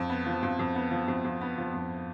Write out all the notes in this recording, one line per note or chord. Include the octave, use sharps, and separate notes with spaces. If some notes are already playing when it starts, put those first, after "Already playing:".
Already playing: F2
B3
F3
F2
F2
B3
F3
F2
F2
B3
F3
F2